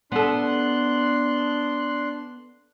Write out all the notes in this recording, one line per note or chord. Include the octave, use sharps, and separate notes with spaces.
B3 D4 A4 C6 F#6